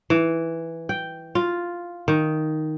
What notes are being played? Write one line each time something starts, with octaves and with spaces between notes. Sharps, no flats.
E3
G5
F4
D#3